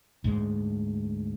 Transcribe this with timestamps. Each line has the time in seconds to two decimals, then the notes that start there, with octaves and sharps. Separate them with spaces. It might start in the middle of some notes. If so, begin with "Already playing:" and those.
0.24 D2 G#2 G#3